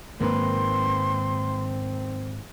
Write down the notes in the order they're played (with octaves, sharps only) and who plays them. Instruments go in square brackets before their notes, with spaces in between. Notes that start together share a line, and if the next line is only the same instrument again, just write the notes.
[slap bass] G#2 D#3 F#3 [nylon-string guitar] A#3 A#4 B4 [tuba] C4 [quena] C6